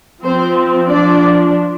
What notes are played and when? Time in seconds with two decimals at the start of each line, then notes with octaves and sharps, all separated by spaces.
0.23 F3 C4 C5
0.88 F3 D4 D5